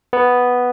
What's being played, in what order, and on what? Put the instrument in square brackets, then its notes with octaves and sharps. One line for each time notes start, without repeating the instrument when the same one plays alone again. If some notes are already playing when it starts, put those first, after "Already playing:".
[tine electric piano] B3